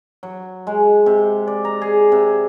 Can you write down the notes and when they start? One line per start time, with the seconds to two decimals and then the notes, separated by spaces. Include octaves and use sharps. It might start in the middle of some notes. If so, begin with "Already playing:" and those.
0.23 F#3
0.67 G#3
1.06 C3
1.48 D5
1.65 A#5
1.82 G#4
2.12 C3